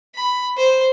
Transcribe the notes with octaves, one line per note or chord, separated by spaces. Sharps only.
B5
C5